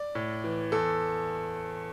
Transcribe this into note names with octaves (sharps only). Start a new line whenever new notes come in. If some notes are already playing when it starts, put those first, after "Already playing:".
Already playing: D5
A2
E3
E2 A4